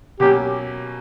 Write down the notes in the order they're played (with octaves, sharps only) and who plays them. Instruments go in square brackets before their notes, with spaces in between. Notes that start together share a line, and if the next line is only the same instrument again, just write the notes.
[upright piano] B2 F#3 A#3 C#4 [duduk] G4